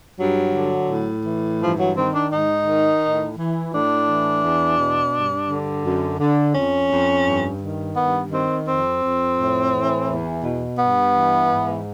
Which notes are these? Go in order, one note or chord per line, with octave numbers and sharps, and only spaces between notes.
G2 F#3
D3
A2
E3
G2 F3
F#3
D#3 C4
D4
G#2 D#4
D#3
A2
E3
A2 D4
E3
E2
B2
G2
D3
F#2
D3
F2 C#4
F2
G2
D#3
G2 B3
D#3 C4
F2 C4
F2
A2
E3
E2
B2
G2 B3
E3
G#2